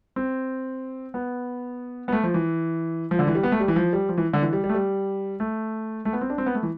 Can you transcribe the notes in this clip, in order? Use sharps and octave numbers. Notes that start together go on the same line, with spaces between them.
C4
B3
B3
A3
F3
E3
F3
D3
E3
G3
B3
A3
G3
E3
F3
G3
F3
E3
D3
E3
G3
G3
A3
G3
A3
A3
B3
C4
D4
C4
B3
A3
E3